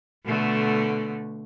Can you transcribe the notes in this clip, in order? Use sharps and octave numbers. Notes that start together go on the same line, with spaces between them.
B2 D3 A3